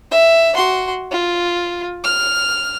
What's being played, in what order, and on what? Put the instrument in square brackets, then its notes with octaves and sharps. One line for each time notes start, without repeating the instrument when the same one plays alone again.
[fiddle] E5
F#4 C6
F4
F6